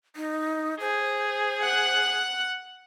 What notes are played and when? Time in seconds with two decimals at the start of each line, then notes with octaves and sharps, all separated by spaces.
0.16 D#4
0.80 G#4 C5
1.61 F#5 F#6